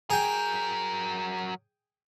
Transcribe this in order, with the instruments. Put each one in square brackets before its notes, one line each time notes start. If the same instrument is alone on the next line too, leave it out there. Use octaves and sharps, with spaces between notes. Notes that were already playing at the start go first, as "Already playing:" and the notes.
[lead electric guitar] F#3 A#4 [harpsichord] G#4 G5